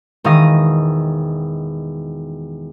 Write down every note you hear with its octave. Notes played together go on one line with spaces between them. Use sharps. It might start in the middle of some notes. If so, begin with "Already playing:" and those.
E1 D#3 F5 D#6 A#6